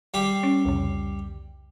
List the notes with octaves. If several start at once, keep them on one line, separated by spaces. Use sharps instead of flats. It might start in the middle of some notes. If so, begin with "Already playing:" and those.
G3 G4 C6
C#4
C2 F2 C#3